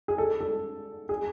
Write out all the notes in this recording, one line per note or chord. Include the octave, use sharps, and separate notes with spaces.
G#4
A4
A4
G#4